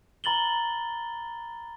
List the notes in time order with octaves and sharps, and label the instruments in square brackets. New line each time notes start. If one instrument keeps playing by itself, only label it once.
[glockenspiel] A#5 B5 A6 F#7 G7